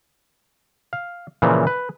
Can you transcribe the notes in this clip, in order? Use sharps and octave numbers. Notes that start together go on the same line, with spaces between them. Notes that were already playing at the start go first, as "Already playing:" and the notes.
F5
A#2 C#3 E3 F3
B4